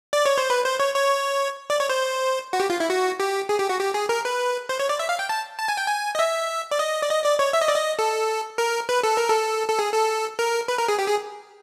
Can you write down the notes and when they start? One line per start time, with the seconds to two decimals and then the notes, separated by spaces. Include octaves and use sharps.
0.13 D5
0.26 C#5
0.38 C5
0.50 B4
0.65 C5
0.80 C#5
0.95 C#5
1.70 D5
1.80 C#5
1.89 C5
2.53 F#4
2.60 G4
2.70 F4
2.80 E4
2.90 F#4
3.20 G4
3.49 G#4
3.60 G4
3.69 F#4
3.80 G4
3.94 G#4
4.09 A#4
4.25 B4
4.69 C5
4.80 C#5
4.89 D5
4.99 E5
5.09 F5
5.19 G5
5.29 A5
5.59 A5
5.68 G#5
5.77 G5
5.87 G#5
6.15 D#5
6.19 E5
6.71 D5
6.79 D#5
7.02 D5
7.09 D#5
7.24 D5
7.39 C#5
7.53 E5
7.61 D#5
7.68 D5
7.76 D#5
7.99 A4
8.58 A#4
8.89 B4
9.03 A4
9.17 A#4
9.30 A4
9.68 A4
9.79 G#4
9.94 A4
10.39 A#4
10.68 B4
10.79 A#4
10.88 G#4
10.99 G4
11.08 G#4